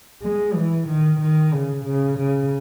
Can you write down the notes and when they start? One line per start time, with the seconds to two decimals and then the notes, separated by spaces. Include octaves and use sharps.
0.22 G#3
0.55 E3
0.88 D#3
1.21 D#3
1.53 C#3
1.85 C#3
2.18 C#3